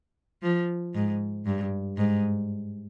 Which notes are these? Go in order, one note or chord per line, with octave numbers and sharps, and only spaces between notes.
F3
G#2
G2
G#2